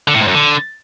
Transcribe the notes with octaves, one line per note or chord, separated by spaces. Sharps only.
D3
A2
G#2
F#2
D3